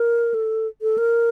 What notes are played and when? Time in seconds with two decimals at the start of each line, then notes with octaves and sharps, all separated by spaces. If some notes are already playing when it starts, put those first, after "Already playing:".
Already playing: A#4
0.34 A4
0.82 A4
0.98 A#4